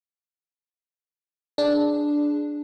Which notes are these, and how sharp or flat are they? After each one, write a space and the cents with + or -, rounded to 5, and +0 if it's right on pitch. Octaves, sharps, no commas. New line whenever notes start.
D4 +0 G#4 +0